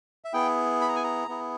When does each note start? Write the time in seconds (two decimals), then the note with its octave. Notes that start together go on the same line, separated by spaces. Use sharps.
0.25 E5
0.33 B3 E4 G#4 G5
0.81 B5
0.88 A#5
0.96 G#5
1.04 A#5
1.28 B3 E4 G#4